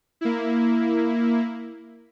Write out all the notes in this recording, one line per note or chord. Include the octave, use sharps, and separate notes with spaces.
A#3 E4